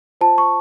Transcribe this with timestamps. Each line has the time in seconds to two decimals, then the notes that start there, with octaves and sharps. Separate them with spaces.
0.21 F4 C5 A5
0.38 C#6